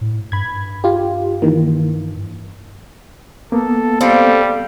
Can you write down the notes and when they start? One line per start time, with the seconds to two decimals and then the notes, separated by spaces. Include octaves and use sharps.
0.01 A2
0.32 G2 B5 G#6
0.84 F4 G4
1.42 D#3 E3 A#3
3.52 A#3 B3 A4
4.01 G3 C4 F4 A4